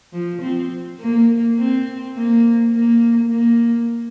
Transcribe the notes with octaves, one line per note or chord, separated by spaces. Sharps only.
F3
C4
A#3
C4
A#3
A#3
A#3